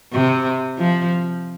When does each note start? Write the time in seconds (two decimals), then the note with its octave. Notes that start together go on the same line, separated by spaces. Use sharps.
0.13 C3
0.78 F3